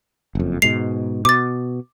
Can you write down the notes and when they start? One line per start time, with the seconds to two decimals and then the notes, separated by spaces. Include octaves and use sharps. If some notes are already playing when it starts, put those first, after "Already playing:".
0.35 F#1 F2
0.62 G#2 B2 G#3 C7 F7
1.25 B2 D6 A6